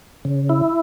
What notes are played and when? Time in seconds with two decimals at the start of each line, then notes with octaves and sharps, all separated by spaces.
0.25 C#3
0.49 E4